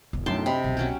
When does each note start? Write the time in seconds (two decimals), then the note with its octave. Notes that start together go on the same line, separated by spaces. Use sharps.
0.13 E1 C4
0.26 B1 F#2 A2 D4 G5 A5 C6
0.46 C3 D#5 B5
0.64 E1 B1
0.77 F#3 C#4 G4